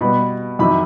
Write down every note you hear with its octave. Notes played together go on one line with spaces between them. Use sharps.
B2 G3 B3 B5
F2 C3 D#3 F#3 B5